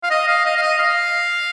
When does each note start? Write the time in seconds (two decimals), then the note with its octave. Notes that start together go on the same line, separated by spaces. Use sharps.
0.03 F5
0.10 D#5
0.28 F5
0.45 D#5
0.57 F5
0.62 D#5
0.79 F5